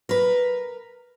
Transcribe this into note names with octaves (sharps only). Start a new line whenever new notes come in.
A#4 B4